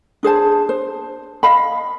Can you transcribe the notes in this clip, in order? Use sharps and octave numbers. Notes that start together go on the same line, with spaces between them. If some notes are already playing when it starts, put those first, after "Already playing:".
D4 G#4 C5 A5
C5
D#5 F5 B5